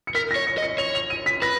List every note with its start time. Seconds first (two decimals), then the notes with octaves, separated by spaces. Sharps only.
0.07 C#7
0.15 A#4 B6
0.31 A#6
0.36 C#5
0.47 C#7
0.58 D#5
0.62 C#7
0.78 C#5 F7
0.95 F7
1.10 D#7
1.26 B6
1.42 B4 A#6